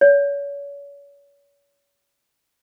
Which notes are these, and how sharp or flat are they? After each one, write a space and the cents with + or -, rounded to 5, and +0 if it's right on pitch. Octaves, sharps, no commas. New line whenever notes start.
C#5 +35